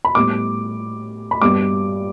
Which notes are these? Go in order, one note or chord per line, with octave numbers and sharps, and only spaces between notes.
B5
A2 G3 B3 D6
B5
G2 G3 B3 D6